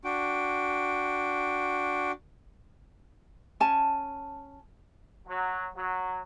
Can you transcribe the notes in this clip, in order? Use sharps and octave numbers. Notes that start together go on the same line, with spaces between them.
D4 F#4 G5
C#4 G#5 A5
F#3
F#3